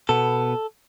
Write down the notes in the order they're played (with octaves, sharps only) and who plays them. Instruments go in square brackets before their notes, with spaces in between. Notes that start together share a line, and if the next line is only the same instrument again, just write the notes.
[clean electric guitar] B2 B3 A4